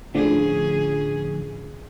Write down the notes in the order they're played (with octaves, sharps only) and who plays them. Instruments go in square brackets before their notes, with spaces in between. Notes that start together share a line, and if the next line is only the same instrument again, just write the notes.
[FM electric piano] A2 D3 F3 [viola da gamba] C#4 G#4